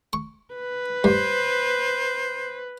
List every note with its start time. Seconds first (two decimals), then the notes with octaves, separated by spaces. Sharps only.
0.13 C#6
0.55 B4
1.04 G2 C5